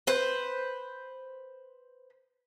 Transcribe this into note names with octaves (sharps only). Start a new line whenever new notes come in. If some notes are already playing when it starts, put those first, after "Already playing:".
B4 C5